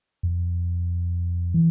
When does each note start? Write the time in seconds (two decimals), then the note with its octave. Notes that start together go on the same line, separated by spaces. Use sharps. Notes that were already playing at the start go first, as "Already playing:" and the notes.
0.23 F2
1.54 E3